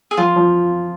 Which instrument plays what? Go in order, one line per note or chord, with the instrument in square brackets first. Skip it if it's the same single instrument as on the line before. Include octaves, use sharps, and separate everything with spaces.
[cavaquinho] G#4
[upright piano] F3 [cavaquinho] F4
[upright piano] F3